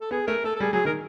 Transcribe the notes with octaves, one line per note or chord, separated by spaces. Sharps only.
A4
B3 G#4
A3 A#4
A3 A4
A4
G3 G#4
F#3 G#4
D#3 A#4